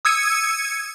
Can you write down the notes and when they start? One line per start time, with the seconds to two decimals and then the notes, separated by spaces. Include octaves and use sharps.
0.05 D#6 E6 G#6 C#7 D#7